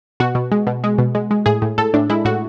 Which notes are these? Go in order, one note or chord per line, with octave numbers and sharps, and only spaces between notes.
B2 F#4
B2
G#3
B2
G#3
B2
G#3
G#3
A2 G#4
A2
A2 A4
A2 D4
G#3 E4
A2 F#4